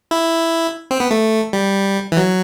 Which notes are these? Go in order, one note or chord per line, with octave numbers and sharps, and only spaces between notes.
E4
C4
B3
A3
G3
E3
F#3